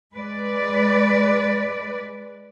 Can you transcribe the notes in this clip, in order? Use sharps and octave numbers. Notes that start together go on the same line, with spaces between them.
G#3 B4 D5